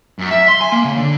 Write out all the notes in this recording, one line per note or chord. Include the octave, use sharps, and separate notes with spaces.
F#2
E5
C6
G#5
A#3
C#3
D3